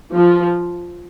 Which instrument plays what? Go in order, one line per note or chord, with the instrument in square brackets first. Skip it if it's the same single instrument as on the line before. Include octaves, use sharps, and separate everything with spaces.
[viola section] F3